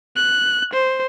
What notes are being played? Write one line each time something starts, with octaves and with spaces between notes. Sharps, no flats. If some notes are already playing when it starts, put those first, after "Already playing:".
F#6
C5